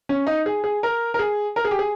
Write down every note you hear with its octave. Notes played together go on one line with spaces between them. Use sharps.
C#4
D#4
G#4
G#4
A#4
A#4
G#4
A#4
G#4
G4
G#4